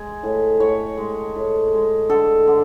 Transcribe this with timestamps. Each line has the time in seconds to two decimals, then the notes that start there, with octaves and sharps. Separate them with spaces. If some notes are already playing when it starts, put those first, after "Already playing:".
Already playing: G#3 G#5
0.23 A2
0.60 A2 C#5
0.97 G#3
1.36 A2
1.73 G#3
2.10 D3 A4
2.48 D3